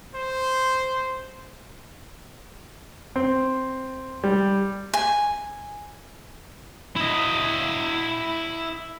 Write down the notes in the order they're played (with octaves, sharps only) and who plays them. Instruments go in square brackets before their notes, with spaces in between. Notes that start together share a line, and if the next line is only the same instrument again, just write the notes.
[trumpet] C5
[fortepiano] C4
G3
[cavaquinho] G#5
[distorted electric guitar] E4 D#5